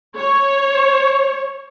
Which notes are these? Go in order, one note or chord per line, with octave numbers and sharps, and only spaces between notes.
C#5